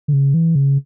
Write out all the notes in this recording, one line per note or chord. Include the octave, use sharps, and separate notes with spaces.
D3
C#3
E3
C#3